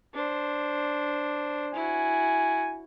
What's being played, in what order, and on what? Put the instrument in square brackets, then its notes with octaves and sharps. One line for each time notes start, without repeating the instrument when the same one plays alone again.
[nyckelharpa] D4 C5
[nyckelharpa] E4 F#4 [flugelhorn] G#5